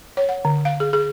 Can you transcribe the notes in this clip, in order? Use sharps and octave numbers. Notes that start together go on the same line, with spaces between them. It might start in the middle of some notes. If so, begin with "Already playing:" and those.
C#5
F#5
D3
F5
G#4
G#4